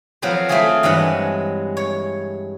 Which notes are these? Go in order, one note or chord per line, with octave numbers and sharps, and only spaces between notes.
F3 F#3 B3 C4 C5
A3 C4 E4 F4 G#4 A5
G2 E3 F#3 G#3 F#5
C#5